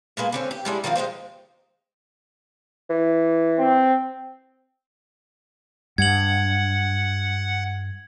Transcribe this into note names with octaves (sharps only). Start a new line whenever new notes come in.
A#2 G#3 A#3 B4
D3 C4 C#4
G4
G3 G#3 D4 E4
D#3 F3 C4 F4
G#3 C4 G4 C5
E3
C4
G2 F#5 G#6 F#7